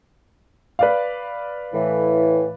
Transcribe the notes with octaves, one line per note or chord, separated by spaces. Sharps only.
B4 D5 F5
A2 E3